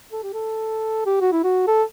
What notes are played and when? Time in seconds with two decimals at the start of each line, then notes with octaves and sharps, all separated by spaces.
0.12 A4
0.23 G4
0.33 A4
1.06 G4
1.21 F#4
1.32 E4
1.44 F#4
1.67 A4